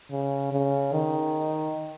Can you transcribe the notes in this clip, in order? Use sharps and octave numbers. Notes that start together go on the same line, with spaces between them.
C#3
C#3
D#3